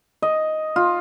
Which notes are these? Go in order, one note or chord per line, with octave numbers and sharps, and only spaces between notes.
D#5
F4